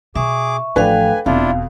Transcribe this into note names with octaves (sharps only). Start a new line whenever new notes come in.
B2 G#4 E5 C#6 D6
A1 F3 D4 A4 B4 F5 G5 G#5
E1 F2 B2 D4 E4 F4 F5